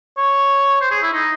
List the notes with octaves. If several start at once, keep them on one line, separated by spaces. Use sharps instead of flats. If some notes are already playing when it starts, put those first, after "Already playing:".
C#5
C5
G#4
E4
D#4